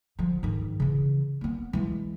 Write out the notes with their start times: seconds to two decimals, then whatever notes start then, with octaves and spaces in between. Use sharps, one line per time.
0.19 D3 F3
0.43 G#2 D#3
0.80 C#3 E3
1.41 A#3 B3
1.73 E3 G#3